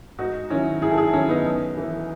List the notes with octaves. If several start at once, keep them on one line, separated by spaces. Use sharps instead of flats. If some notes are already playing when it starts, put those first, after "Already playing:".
G#2 D#4 F#4
D#3 F#3 C#4 E4
G#2 E4 G#4
A4
E4 G#4
D#3 F#3 C#4 E4
B3 D#4
F#2
E3